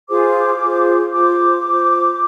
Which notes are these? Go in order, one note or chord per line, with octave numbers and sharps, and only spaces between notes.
F4 G#4 C5 D6
F4 G#4 C5
F4 C5 D6
F4 C5